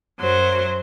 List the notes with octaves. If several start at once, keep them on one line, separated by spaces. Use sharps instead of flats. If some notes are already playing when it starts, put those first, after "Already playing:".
F#2 F#3 C5